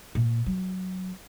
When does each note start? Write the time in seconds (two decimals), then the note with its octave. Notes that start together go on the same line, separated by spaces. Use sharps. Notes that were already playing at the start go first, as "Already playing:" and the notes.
0.15 A#2
0.46 F#3